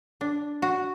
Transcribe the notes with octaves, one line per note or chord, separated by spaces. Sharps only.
D4
F#4